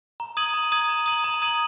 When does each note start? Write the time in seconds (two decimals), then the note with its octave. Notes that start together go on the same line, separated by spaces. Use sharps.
0.20 A#5
0.37 D#6 G#6 D#7 F#7
0.54 A#5
0.72 D#6 G#6 D#7 F#7
0.89 A#5
1.06 D#6 G#6 D#7 F#7
1.24 A#5
1.42 D#6 G#6 D#7 F#7